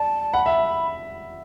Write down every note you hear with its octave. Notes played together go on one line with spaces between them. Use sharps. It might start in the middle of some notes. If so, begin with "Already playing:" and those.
Already playing: D5 A5
F#5 B5
E5